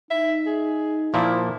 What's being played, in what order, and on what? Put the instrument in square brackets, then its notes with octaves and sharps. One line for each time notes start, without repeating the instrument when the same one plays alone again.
[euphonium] D#4 [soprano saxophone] E5
[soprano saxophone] G#4
[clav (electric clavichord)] A#2 F3 A#3 [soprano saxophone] E4